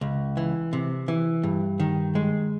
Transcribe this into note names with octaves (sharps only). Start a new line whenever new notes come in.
C#2
E3
C3
E3
G2
D#3
G#3